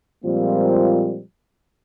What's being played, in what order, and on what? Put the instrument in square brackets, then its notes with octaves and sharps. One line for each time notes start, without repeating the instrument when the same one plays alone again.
[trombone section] A#2 F3 G3 G#3 A#3 C4